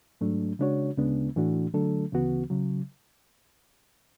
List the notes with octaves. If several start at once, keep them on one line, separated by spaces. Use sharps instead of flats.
G#2 F#3 A3 D4
C#3 G#3 D4 F#4 C#5
D2 C#3 G#3 B3 D4
A2 E3 A3 D4 F#4
D3 F#3 A3 D4 A4
D2 C#3 E3 B3 F#4
C#3 F#3